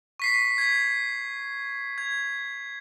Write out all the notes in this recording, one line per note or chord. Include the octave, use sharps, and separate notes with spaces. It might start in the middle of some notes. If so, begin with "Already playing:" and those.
C#6 B6 C7
G#6 B6
G#6